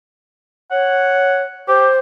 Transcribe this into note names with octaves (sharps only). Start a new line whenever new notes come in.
C#5 F#5
G4 C5